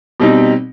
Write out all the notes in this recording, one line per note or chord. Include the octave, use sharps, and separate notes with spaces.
B2 G3 C4 D#4